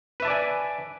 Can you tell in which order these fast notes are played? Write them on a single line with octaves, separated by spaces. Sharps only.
B4 E5 A5 D5 G#5